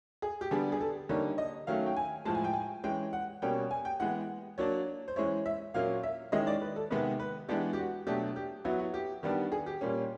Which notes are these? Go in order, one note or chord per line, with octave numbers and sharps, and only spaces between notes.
G#4
G4
D3 G3 B3 D4 G#4
G#4
A4
D3 G3 A#3 D#4 C#5
D#5
D#3 F#3 A3 C#4 F5
G5
G#5
A2 F3 G#3 A5
G#5
G5
G#5
E3 G#3 C#4 G5
F#5
B2 G3 A#3 C#4 G5
G#5
G5
E3 G#3 B3 F#5
F#3 A#3 D4 C#5
C5
E3 G#3 C#4 E4 C#5
E5
A#2 F#3 A#3 C#4 F5
E5
D#3 G#3 C#4 E4 D#5
D5
B4
A4
C3 D#3 G#3 B3 B4
B4
E3 G#3 B3 D4 G4
G4
F#4
B2 F#3 A3 D4 G4
G4
F#3 B3 E4 F#4
F#4
G4
D#3 G3 B3 D4
G#4
G4
A#2 G3 A#3 C#4